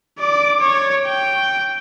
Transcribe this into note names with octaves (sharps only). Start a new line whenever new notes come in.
D5 D6
C#5
G5